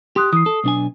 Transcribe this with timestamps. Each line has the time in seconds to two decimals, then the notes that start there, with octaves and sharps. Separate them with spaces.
0.16 G4 C6 D#6 F#6
0.33 E3 D#6 C7
0.46 A4
0.64 B1 D4 G#5